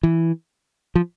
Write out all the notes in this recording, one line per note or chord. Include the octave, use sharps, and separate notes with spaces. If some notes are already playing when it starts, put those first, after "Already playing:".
E3
F3